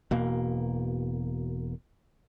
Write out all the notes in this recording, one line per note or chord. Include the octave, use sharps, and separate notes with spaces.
E1 B2 A#3